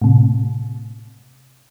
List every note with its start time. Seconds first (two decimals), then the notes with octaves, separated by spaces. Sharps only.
0.02 A2 C3